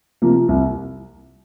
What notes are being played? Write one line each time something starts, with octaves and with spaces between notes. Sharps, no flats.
C3 F3 A#3
C2